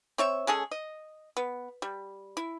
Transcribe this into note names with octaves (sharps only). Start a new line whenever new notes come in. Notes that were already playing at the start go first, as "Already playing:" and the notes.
C4 C#5 E5
G#3 C#4 G#4 A4
D#5
B3
G3
E4